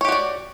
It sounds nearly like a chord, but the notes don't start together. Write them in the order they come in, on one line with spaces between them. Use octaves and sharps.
C#5 G4 F#4 D5